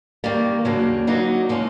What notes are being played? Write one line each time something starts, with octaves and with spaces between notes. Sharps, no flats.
D#3 G3 A#3
D#2 C#3 F#3 A#3 D4
D3 F#3 A#3 D#4 F#4
A#2 F3 G#3 C#4